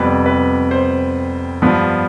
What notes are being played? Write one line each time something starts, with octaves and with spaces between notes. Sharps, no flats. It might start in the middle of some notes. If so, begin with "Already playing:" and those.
Already playing: F2 C3 G3 B3 B4
B4
C5
G2 F3 B3